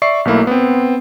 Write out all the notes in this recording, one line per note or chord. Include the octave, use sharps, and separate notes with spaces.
D5 E5 C#6 C7
B1 A3 A#3 E4
B3 C4